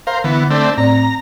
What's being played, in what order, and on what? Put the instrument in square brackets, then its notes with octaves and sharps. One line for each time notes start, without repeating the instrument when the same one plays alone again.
[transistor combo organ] A#4 C5 [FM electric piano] F5
[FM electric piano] D3 [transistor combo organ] E3 B3
[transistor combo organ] A3 C4 D4
[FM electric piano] A2 C4 D5 [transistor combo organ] A#5